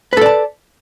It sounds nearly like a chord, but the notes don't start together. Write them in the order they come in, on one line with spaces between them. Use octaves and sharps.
B4 A4 D5 A5